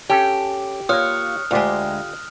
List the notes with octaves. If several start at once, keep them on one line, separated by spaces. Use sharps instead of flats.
C#4 G4 A4 G5
A#3 F4 C#5 D#6 F6 F#6
D2 D3 G#3 F4 G4